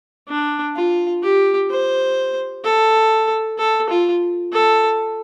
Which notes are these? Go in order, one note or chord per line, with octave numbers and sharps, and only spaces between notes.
D4
F4
G4
C5
A4
A4
F4
A4